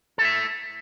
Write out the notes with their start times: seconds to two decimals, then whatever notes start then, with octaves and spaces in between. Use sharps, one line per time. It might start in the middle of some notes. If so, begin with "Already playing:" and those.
0.18 A4
0.21 E4
0.25 E5